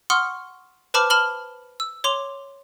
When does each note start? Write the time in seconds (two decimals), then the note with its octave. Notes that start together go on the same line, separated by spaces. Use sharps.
0.10 F#5 C6 C#6 D#6 F6
0.94 B4 C5 A5 B5 D6 F6
1.10 A5 B5 F6 F#7 G7
1.80 E6
2.04 C#5 C6 D6 F7